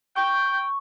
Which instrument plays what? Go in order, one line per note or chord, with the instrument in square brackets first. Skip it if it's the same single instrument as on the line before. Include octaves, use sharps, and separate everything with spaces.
[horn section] G5 [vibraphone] C#6